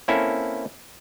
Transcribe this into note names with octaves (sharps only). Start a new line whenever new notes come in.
A#3 C4 C#4 E4 A4